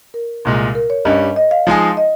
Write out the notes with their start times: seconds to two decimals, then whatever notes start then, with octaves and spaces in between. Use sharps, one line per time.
0.14 A#4
0.45 C2 A#2 G#3
0.75 A#4
0.90 C#5
1.05 G2 G3 C#4 D#5
1.36 D#5
1.51 F5
1.67 F3 G#3 D#4 G#4
1.97 D#5